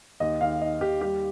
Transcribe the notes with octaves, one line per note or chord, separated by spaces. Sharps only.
D#2 D#5
D#2 F5
D#4 D#5
D#2 G4
G3 G4